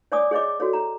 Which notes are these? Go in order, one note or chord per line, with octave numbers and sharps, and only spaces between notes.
C#5 D5 G#5 D6 D#6
G#4 C#5 D#5 D6
F#4 A4 C#5
A#5